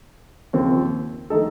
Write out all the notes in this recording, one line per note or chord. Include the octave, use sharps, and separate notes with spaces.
D#2 C#3 F3 C4 F4
D#3 A3 D#4 A4